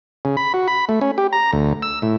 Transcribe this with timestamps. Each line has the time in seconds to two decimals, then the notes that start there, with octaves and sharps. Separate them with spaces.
0.25 C#3
0.37 B5
0.54 F#4
0.68 B5
0.89 A3
1.01 C#4
1.18 G4
1.33 A#5
1.53 D2
1.82 E6
2.02 A2